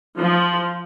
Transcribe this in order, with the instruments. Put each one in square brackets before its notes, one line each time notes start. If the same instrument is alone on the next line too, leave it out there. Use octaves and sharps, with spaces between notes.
[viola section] F3